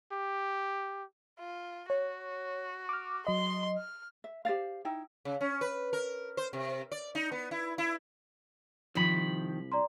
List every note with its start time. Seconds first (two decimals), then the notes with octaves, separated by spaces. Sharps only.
0.12 G4
1.39 F4
1.90 F#4 C#5
2.89 D6 F6
3.27 F#3 D#5 C6
3.78 F6
4.24 E5
4.45 G4 C5 D5 F5
4.85 D#4 E4 G5
5.25 C#3
5.41 C#4
5.61 B4
5.93 A#4
6.37 C5
6.53 C3
6.92 D5
7.15 D#4
7.32 B3
7.51 E4
7.78 E4
8.95 C2 D#3 F3 B5
9.72 D5 A#5 C6